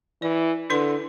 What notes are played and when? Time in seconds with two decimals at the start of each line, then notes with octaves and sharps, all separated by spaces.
0.22 E3 D5
0.70 D3 E4 B4 C6